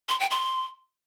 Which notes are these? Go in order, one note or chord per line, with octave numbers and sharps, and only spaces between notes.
C6
G5
C6